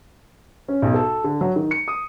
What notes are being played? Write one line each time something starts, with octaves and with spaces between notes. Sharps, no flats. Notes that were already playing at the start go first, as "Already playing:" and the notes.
C#4
B1
A4
D3
F#3
D#3
C#7
D#6